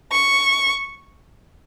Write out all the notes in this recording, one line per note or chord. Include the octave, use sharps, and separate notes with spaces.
C#6